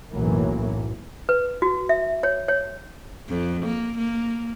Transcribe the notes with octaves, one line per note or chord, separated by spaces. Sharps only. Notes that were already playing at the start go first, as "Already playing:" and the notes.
B1 F#2 A2 E3 F#3 A#3
B4
F#4
E5
C#5
C#5
F2
A#3
A#3